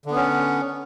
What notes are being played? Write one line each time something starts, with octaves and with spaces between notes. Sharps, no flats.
D3 B3 C#4